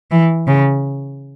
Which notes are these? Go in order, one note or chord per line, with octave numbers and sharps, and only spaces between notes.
E3
C#3